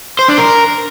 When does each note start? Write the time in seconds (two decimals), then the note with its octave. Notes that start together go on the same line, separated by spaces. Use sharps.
0.19 C5
0.28 D4
0.38 A#4